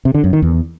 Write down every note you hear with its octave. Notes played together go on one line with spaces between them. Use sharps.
C3
D3
F#2
D#3
E2